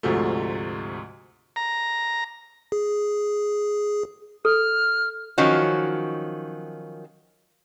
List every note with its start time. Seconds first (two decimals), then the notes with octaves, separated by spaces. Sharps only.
0.03 D2 G#2 C3 F3 A3
1.56 A#5
2.72 G#4
4.45 A4 F6
5.38 D#3 F3 F#3 C#4 F#4